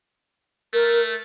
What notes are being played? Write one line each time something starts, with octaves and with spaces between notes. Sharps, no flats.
A3 A#4